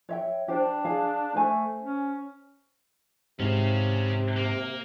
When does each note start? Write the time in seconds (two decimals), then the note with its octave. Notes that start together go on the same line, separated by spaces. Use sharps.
0.09 C#5 E5 G5
0.48 D4 G4 C5
0.85 G#4 F5 A5
1.35 A3 C5 G#5
1.81 C#4
3.40 G#2 C3 C#4 F5
4.37 A#3